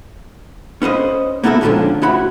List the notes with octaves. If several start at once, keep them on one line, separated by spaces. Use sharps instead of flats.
C#4 B4 C5 D#5
A#3 B3 E4 F#4 G4 A4
F2 G#2 D3 F3 C#4 D4
D2 E4 F#4 B5